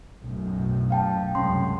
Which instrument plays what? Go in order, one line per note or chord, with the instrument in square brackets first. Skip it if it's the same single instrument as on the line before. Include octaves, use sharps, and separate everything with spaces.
[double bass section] B1 F#2 A2
[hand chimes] F5 G5 A5
[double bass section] C2 F#2 G#3 [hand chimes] C#4 C6